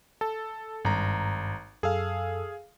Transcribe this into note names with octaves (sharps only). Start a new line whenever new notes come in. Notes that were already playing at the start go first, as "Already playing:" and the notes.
A4 A5
G#1 G2 A#5
F#2 G#4 A4 F5 E6